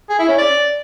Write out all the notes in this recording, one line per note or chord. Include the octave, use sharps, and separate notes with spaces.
G#4
E4
C#4
D5